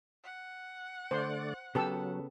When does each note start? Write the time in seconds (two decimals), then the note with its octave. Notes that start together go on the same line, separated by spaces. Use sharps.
0.24 F#5
1.11 D3 A3 C5 D5 C6
1.75 C#3 F#3 B3 G4 A4 A5 E6